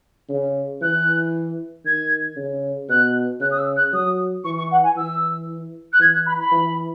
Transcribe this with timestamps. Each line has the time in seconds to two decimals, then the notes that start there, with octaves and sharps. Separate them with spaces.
0.29 C#3
0.81 E3 F#6
1.85 D#3 G#6
2.37 C#3
2.89 B2 F#6
3.40 C#3 F#6
3.50 D#6
3.58 E6
3.76 F#6
3.93 F#3 D#6
4.44 E3 C#6
4.57 C#6
4.71 F#5
4.83 G#5
4.96 E3 E6
5.92 F#6
6.00 E3 G#6
6.13 F#6
6.26 B5
6.39 B5
6.52 E3